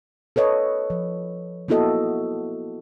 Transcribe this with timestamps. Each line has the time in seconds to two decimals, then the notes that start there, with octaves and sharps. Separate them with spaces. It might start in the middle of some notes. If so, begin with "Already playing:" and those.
0.36 A4 B4 C#5 D#5
0.90 F3
1.68 A#3 B3 E4 F#4 A4 D#5